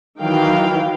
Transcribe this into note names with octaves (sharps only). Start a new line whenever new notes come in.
D#3 E3 F#3 F5 G5